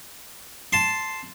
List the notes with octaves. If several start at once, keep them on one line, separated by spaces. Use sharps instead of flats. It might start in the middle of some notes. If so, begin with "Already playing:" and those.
A5 C6